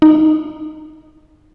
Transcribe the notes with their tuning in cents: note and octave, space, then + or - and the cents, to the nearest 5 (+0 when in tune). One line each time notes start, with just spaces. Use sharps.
D#4 -10